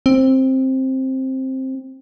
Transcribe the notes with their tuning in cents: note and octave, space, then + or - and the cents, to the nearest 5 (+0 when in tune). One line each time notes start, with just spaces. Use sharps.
C4 +10